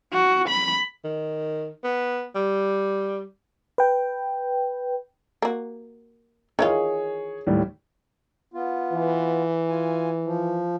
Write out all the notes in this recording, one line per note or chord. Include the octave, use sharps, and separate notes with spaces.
F#4
B5
D#3
B3
G3
B4 G5
A#3 F#4
D#3 E3 F4 G#4 C#5
D#2 A2 G3
B3 F4
E3
F4 G#5
F3